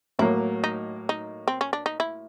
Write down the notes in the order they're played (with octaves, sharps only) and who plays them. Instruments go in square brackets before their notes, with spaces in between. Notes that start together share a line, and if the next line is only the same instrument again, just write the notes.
[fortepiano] A2 F#3 A#3 [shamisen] E4
[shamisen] D#4
D#4
C4
C#4
D4
D#4
E4